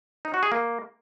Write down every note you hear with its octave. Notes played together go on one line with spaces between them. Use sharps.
D#4
F#4
G#4
A#3